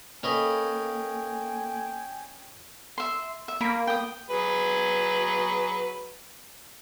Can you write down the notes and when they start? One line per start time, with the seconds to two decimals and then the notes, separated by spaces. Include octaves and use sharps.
0.23 A#3 C#4 A4 B4 D#5 G5 G#5 F7
2.98 E5 C6
3.48 E5
3.61 A#3 A#4 B5
3.87 G5 D#6
4.30 F#3 G#4 B4